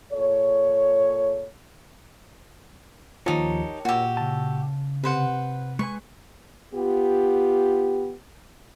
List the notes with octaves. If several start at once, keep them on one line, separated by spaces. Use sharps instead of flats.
A#2 A4 C#5
D#2 F3 D#4 G4 A#4 C#5 A5
A#2 F#4 G4 E6
C#3 A5
C3 B4 C5 F#5
G#3 B4 G#5 C#6
B3 F4 G4